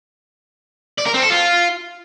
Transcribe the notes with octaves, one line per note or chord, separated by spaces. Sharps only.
D5
A#4
C4
A4
F4